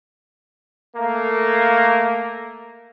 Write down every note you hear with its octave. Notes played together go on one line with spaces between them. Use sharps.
A3 A#3